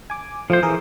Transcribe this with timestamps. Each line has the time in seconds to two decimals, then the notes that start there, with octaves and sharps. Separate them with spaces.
0.10 G#5 D6
0.50 F3 A3 C4 F4 C5
0.63 E3 G#4 A#4